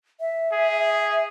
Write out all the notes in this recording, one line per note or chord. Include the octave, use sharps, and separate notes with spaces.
E5
G#4